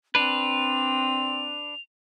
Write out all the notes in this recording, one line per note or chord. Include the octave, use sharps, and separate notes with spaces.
C4 D4 B4 F7